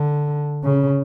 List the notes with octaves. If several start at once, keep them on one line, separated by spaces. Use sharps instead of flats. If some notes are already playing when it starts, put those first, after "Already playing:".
Already playing: D3
C#3